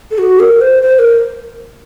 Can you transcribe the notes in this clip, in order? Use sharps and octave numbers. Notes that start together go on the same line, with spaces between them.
A4
F#4
A#4
C5
C5
A#4